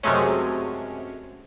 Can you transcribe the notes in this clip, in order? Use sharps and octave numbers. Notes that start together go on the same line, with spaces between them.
F#2 C3 F#3 G#3 A3 C#4